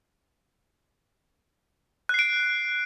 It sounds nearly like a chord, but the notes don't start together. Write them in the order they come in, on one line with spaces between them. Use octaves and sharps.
F#6 C7 D7